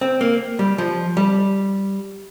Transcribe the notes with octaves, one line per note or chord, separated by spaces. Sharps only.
C4
A#3
G3
F3
G3